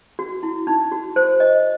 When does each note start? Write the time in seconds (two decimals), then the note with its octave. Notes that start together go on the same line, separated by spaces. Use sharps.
0.19 F#4
0.43 E4
0.67 D#4
0.92 F#4
1.16 C5
1.40 D#5